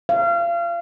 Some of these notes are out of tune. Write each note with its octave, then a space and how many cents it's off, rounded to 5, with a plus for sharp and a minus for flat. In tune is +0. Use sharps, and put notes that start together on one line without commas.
F5 -30